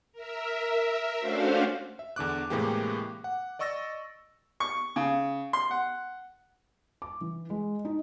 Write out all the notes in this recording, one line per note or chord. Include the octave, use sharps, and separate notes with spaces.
A#4 E5
A3 C#4 D4 F#4 C5 F5
E5
E2 D3 D6 F#6
A2 C3 E3 G#3 A#3 G4
F#5
D5 D#5 C#6 E6 A6 A#6
C#6
C#3
C6
F#5
D6
E3
G#3
D#4